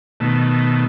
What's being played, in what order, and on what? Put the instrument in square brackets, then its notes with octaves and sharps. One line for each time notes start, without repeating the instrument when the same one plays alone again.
[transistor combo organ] B2 D#3 A3